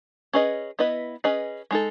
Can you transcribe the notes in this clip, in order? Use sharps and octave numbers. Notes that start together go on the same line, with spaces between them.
C#4 G#4 B4 D#5
B3 E4 B4 D#5
C#4 G#4 B4 D#5
G#3 D#4 A4